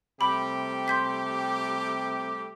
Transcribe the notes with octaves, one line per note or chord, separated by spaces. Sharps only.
C3 G3 A3 G4 B5
C6 G6 B6